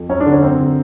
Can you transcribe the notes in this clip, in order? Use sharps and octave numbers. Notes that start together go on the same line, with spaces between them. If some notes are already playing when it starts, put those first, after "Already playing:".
Already playing: F2
F#2 C#4
D4
D3
C#4
F#2 C4
D3